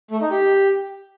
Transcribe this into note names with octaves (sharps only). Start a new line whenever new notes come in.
A3
D#4
G4